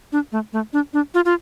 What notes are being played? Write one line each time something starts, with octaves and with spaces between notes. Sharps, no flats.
D4
A3
A3
D4
D4
F4
F4